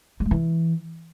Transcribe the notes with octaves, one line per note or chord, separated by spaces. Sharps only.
G3
G#3
E3